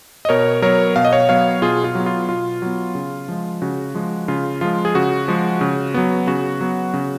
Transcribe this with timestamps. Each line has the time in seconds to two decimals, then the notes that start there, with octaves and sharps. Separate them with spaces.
0.25 D#5
0.29 B2 A#4 C#5
0.62 F#3 B3 A#4 C#5
0.96 B2 F5
1.05 D#5
1.13 C#5 F5
1.29 F#3 B3 C#5 F5
1.62 B2 F4 G#4
1.84 F4
1.95 F#3 B3
2.06 F4
2.29 B2 F4
2.62 F#3 B3
2.95 C#3
3.29 F3 G#3
3.62 C#3 F#4
3.95 F3 G#3
4.28 C#3 F4
4.61 F3 G#3 F4
4.85 G#4
4.95 C#3 F#4
5.28 F3 G#3
5.61 C#3
5.94 F#3 B3
6.27 C#3 F#4
6.61 F#3 B3
6.94 C#3